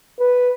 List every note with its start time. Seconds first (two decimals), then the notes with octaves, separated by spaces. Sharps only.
0.19 B4